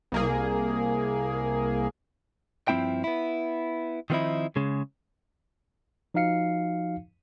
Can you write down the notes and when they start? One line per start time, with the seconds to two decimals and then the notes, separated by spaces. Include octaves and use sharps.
0.12 C2 A#3 G#4
2.68 G2 F3 A#3 C4 E4 G5
3.04 B3 E4
4.10 D#3 F3 B3 C4 D#4 E4
4.56 C#3 G#3
6.14 F3 D#4 F#4 F5 C7 C#7